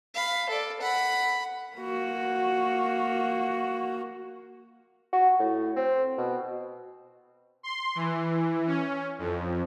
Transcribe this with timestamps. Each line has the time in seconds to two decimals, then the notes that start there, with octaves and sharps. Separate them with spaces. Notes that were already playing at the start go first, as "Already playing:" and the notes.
0.14 F5 B5
0.49 A4 D5
0.81 F#5 B5
1.77 A#3 F#4
5.13 F#4
5.39 A2
5.76 C4
6.18 B2
7.63 C6
7.95 E3
8.67 C#4
9.19 F2